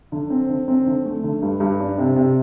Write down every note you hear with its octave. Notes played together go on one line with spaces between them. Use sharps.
D3
C4
D3
C4
D3
A3
D3
G2
G2
D4
C3
C3